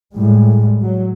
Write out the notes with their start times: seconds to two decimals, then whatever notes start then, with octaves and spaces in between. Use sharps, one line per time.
0.15 A2 G3 G#3
0.81 F#3